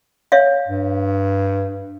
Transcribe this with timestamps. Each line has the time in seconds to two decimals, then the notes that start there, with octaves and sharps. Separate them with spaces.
0.32 C#5 E5 F5
0.68 G2